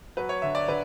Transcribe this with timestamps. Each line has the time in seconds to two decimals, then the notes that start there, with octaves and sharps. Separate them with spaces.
0.17 F#3 B4
0.29 C#5
0.42 D3 E5
0.55 D5
0.68 D3 B4